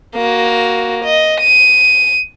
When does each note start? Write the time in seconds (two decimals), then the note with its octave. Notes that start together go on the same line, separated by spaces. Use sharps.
0.15 A#3 F#4
1.05 D#5
1.41 D#7